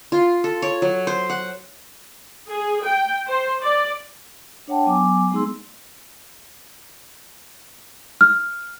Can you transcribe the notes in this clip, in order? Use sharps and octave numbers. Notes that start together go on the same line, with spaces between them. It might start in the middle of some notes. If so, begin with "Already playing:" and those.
F4
A4
C#5
F#3
C5
F#5
G#4
G5
C5
D5
D4 C#5 F#5 G5 A5
F#3 B3 G#5 D6
G#3 B3 D#4 G#4 C6 E6
F6